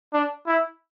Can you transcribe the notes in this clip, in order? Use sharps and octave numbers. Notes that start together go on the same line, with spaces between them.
D4
E4